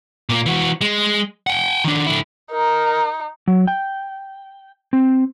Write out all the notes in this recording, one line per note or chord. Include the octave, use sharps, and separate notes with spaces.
A#2 A#3
E3 F#4
G#3
F#5 G5
D#3 D4
D3 E4
D#4 A#4
F#3
G5
C4